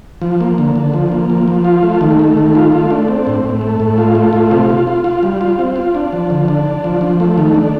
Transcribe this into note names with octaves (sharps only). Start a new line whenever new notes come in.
F3
A#3
D3
D3
F3
A#3
F3
F3
F4
A3
D#3
A3
D#3
F4
A3
D4
C4
A2
A2
A3
A2
F4
A3
F4
C3
F4
F4
F4
G3
F4
C4
F4
D4
F3
D3
D4
D4
F3
F3
A3
D#3
D4